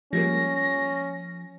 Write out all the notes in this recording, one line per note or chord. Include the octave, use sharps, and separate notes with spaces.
F3 G3 G#3 A#3 C#4 A#6